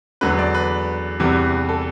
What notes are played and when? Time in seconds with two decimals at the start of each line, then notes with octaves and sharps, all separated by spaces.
0.21 E2 D3 F#3 B4
0.38 D5
0.54 B4
1.20 E2 C3 E3 G3
1.69 A4